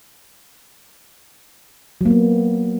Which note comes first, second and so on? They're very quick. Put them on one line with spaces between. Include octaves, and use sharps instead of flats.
F#3 A#3 B3